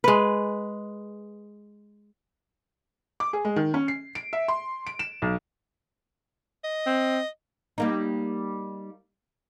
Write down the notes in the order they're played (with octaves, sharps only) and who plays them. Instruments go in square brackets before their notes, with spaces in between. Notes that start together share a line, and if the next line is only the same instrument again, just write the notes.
[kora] G#3 B4
[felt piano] D6
G#4
G#3
D#3
C#4
C7
D7
E5
C6
D7
E7
B1
[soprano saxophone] D#5
[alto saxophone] C4
[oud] G3 A#3 D#4